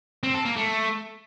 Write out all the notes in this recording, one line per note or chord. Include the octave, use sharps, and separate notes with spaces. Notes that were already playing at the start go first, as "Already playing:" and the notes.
C4
A4
A#3
A3